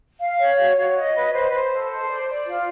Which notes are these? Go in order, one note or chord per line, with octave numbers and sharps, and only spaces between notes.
F5
C#5
F#4
F#4
D#5
B4
C5
C5
A4
C5
D5
D5
F4